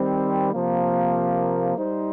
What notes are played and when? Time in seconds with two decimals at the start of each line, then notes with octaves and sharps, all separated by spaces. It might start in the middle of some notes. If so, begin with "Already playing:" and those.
Already playing: D#3 G3 C4
0.51 C3 F3 A#3
1.73 G3 D#4 C5